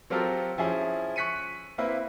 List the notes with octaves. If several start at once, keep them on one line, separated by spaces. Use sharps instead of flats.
F#3 C4 F4 G4 A4 A#4
F3 C#4 E4 G#4
C#6 F#6 B6 C#7 D#7
A#3 C4 E4 B4